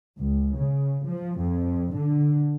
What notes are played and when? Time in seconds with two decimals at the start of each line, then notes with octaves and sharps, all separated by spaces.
0.19 C#2
0.57 C#3
1.07 F3
1.39 F2
1.96 D3